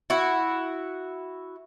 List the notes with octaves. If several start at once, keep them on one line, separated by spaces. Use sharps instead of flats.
E4 F#4